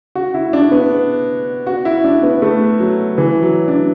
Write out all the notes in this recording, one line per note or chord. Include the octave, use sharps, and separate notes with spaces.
F#4
E4
D4
B3
F#4
E4
D4
B3
A3
F#3
E3
F#3
D4